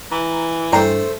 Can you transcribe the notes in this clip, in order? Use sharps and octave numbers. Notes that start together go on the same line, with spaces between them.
E3 A#5
G2 A3 D4 E4 C5 G5 A#5 C6